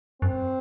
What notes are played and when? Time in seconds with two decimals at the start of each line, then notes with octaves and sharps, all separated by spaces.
0.22 F#2 C4